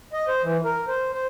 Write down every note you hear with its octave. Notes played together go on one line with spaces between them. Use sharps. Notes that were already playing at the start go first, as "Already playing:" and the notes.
D#5
C5
E3
A#4
C5
C5